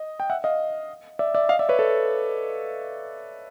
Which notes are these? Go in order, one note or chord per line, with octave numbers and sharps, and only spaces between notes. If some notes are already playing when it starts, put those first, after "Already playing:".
Already playing: D#5
G5
E5 F#5
D#5 F5
D5 E5
D5 E5
D#5 F5
D5 E5
B4 C#5
A4